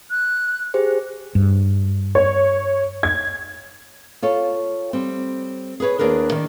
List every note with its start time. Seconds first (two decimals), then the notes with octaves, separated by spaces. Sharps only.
0.11 F#6
0.74 G4 G#4 C5
1.35 G2
2.15 C#5
3.03 G#6
4.22 F4 A4 C#5
4.93 G3 C4
5.80 G#4 A4 B4 C#5
5.99 D#2 G3 D4 G#4 A#4 B4
6.32 D#3 D4